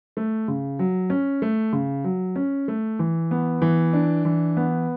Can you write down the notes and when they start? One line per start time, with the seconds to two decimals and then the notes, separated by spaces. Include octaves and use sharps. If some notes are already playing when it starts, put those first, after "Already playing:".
0.17 A3
0.48 C#3
0.79 F#3
1.10 C#4
1.42 A3
1.73 C#3
2.04 F#3
2.36 C#4
2.68 A3
2.99 E3
3.31 B3
3.62 E3
3.93 D4
4.25 E3
4.57 B3